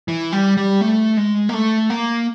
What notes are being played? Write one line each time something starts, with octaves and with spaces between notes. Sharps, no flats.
E3
G3
G3
A3
G#3
A#3
A3
A#3